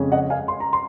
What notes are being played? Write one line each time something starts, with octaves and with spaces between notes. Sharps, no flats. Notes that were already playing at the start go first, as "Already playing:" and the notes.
Already playing: F2 C#3 G#3 C#4
D#5 F#5
F5 G#5
C6
A#5
C6